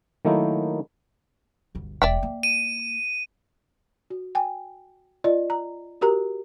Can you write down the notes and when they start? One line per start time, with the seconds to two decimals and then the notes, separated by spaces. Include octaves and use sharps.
0.25 D#3 F#3 A3 A#3 D#4 E4
1.75 G1 D2
2.02 E1 D5 E5 G5
2.23 A#3
2.43 D#7
4.10 F#4
4.35 G5 G#5
5.24 F4 D5 D#5
5.50 A#5
6.01 F#4 G4 A#4 A#5